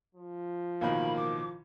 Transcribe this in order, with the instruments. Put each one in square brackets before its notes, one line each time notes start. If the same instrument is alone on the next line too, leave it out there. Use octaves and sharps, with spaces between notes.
[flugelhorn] F3
[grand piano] A1 B2 D#3 [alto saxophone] A#3 [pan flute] B5
[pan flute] D6